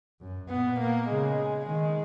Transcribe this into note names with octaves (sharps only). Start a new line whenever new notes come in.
F#2
A#2 B3
A#3
C#3 G#3
D#3 G#3